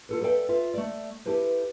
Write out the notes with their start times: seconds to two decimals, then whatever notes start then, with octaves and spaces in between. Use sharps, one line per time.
0.09 F4 A4 B4
0.21 A4 B4 D5 E5 F5 G5
0.49 F4 E5
0.74 A3 D5
1.26 E4 G4 A4 B4 C5